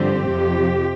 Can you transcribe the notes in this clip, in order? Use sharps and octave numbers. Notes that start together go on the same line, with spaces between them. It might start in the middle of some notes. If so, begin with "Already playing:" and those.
Already playing: G2 D3 F3 C4 G4
F2 C3 F3